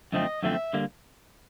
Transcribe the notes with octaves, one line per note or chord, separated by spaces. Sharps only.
F#2 D3 F3 A3 C4 D#5
F#2 D3 F3 A3 C4 E5
D3 G3 A#3